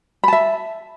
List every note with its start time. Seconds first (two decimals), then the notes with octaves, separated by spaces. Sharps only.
0.24 B5
0.28 A5
0.33 E5